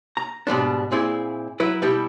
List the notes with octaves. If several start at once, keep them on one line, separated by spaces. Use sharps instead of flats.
A#5
G#2 B2 G3 D4
A#2 C4 E4 G#4 D5
F#3 E4 B4
B2 G3 E4 G4